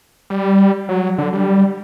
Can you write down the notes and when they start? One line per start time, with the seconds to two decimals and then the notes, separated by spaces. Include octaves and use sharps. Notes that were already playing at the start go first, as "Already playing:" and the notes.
0.30 G3
0.89 F#3
1.18 D3
1.33 G3